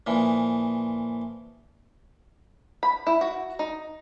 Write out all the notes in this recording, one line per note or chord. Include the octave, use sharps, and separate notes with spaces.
A#2 E3 F3
B5
E4
F#4
D#4